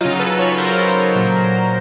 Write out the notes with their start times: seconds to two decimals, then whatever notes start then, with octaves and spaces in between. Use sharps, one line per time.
0.01 C#3 F#3 D#4 F4
0.19 A4 B4
0.39 B4 C#5
0.58 A#4 C5
1.16 A#2 F#3